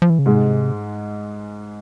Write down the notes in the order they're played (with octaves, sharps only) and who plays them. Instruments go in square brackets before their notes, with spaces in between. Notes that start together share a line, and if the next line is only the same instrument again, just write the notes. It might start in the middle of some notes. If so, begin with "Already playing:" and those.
[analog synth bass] F3
E3
C#3
[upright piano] G#2 G#3 [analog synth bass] C3